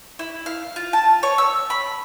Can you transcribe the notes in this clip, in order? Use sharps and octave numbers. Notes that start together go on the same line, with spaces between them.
E4
F5
F4
A5
C#5
E6
B5